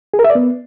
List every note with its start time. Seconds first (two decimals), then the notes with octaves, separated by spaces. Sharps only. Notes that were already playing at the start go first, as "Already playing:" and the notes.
0.14 G#4
0.19 A#4
0.24 E5
0.30 D5
0.35 B3